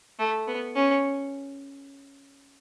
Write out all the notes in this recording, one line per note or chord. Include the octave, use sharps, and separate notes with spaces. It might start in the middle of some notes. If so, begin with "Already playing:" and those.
A3
B3
C#4